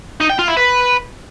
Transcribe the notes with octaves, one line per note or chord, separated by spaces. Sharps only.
D#4
G5
F4
E4
B4